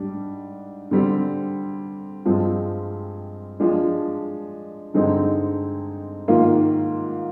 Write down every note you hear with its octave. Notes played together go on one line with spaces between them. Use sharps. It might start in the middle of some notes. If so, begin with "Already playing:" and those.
Already playing: G#2 G3 D4
D3 G3 C4
G2 F3 G#3 C4
F3 G#3 D4
G2 D3 G#3 C4 D#4
G#2 D#3 A#3 F4